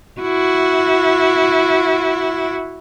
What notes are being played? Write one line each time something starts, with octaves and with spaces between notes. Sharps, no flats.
E4 F#4